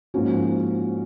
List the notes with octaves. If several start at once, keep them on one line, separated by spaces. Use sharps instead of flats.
G#2 F3 A#3 C#4 F#4